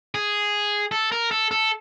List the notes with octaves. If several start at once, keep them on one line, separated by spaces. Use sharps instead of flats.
G#4
A4
A#4
A4
A4